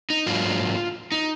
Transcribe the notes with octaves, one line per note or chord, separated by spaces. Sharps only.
D#4
G#2 F#3 A#3 D4 F4
D#4